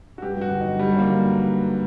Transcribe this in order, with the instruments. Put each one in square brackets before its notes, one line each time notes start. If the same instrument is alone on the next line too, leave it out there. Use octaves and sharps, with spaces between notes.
[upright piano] F#4
G2 G4
G2 F#4
D3
F#3 D#4
D3 G3
D3 A#3
F#3